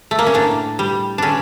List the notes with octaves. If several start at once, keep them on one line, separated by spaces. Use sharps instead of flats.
A3
A#3
C#4
A2 D4
G3
D3 C#4 D4